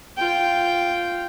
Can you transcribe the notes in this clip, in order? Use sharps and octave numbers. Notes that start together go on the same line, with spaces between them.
F4 G5